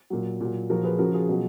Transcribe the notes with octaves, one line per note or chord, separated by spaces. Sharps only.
A#2 F#3
A#2 F#3
A#2 F3 F#4 A#4
G#4 B4
C#3 F3 F#4 A#4
F4 G#4
B2 F#3